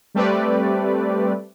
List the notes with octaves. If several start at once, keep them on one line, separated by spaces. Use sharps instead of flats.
G3 A3 C4 G4 B4 D5